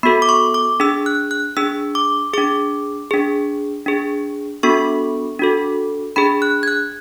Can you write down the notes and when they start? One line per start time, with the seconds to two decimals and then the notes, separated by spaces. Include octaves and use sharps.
0.03 B3 F#4 A4 B5
0.22 D6
0.29 C#6
0.54 D6
0.80 D4 G#4 E6
1.06 F#6
1.31 F#6
1.57 D4 G#4 E6
1.95 D6
2.34 D4 G#4 D6
3.11 D4 G#4
3.86 D4 G#4
4.63 B3 D4 F#4 A4 C#6
5.39 D4 F#4 A4
6.16 D4 G#4 B5
6.42 F#6
6.63 G#6
6.68 F#6